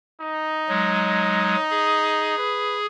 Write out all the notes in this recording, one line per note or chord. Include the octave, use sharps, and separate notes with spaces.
D#4
F#3 G#3
G#4
B4